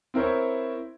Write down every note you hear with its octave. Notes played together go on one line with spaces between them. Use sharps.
C4 E4 A#4 C5 C#5